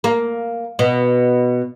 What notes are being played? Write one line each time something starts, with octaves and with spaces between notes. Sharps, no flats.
A#3
B2